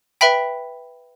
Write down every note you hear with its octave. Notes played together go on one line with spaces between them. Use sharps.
B4 E5 G5 B5 B6